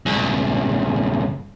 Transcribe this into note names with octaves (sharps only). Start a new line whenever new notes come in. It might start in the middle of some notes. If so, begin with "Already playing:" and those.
C#2 G2